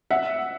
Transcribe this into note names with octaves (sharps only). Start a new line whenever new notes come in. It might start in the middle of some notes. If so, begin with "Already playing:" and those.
E5 F#5